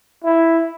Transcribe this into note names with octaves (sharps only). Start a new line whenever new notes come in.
E4